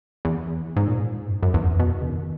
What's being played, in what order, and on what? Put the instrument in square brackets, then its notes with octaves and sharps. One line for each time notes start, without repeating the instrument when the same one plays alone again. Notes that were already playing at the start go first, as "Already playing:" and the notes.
[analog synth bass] E2
G#2
A#2
G#2
F#2
G#2
F#2
E2
F#2
E2
B2
C#3
D#3